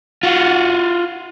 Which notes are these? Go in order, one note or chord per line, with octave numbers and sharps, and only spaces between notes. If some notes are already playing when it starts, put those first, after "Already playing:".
F4 F#4